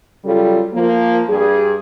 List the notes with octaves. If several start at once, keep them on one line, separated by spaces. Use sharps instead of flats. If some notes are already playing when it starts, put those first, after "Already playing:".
C#3 F#3 G3 F4 A4
F3 A#3
G2 G3 G#4